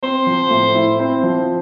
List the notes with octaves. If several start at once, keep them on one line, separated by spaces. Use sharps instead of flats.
C4 C5
F3
A2
E4
C4
F3